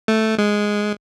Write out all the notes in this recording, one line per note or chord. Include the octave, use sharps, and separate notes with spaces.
A3
G#3